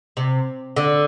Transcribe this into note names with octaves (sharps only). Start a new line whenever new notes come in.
C3
D3